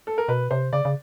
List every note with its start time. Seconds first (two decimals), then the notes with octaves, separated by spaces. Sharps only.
0.07 A4
0.18 A#4
0.28 B2 B4
0.51 C3 C5
0.73 C#3 D5
0.85 C#3